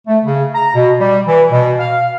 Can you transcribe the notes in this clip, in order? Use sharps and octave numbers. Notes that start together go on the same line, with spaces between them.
A3
C#3
A#5
B2
G3
E3
B2
F5